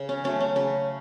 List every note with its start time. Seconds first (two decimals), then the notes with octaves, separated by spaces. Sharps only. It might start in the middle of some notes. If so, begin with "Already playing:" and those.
Already playing: C#3
0.09 C#4
0.24 F#3 A3 C#4
0.40 C#4
0.56 C#3 C#4